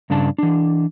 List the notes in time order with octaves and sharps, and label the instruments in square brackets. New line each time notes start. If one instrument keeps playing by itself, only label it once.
[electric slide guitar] G2 C#3 D4 A5
E3 D4